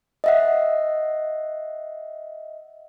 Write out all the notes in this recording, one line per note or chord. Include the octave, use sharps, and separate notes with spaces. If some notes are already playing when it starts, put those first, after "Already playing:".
D#5 E5 F#5